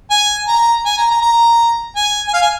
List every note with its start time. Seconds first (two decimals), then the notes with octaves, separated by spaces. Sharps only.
0.11 G#5
0.48 A#5
0.86 G#5
0.98 A#5
1.11 A#5
1.22 A#5
1.96 G#5
2.28 G#5
2.34 F5
2.42 G#5